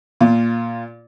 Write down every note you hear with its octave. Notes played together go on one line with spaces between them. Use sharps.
A#2 F4